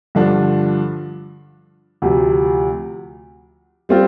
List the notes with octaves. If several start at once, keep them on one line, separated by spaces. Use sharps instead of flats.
G2 D3 F3 D4
D2 C3 F3
G3 C4 F4